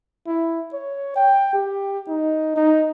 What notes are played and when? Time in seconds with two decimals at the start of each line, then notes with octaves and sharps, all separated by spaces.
0.27 E4
0.73 C#5
1.16 G5
1.53 G4
2.08 D#4
2.56 D#4